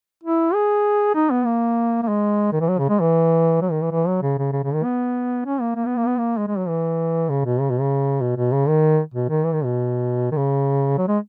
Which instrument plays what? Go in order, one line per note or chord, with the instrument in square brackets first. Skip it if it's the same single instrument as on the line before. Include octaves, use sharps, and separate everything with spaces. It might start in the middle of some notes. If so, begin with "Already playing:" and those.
[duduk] E4
G#4
D#4
B3
A#3
A#3
G#3
D#3
E3
F#3
C#3
G#3
E3
F#3
D#3
E3
E3
F#3
C#3
C#3
C#3
C#3
D#3
B3
C#4
A#3
A#3
B3
A#3
B3
A#3
G#3
G#3
F#3
E3
C#3
B2
C#3
B2
C#3
B2
B2
C#3
D#3
B2
D#3
E3
D#3
B2
D#3
C#3
F#3
G#3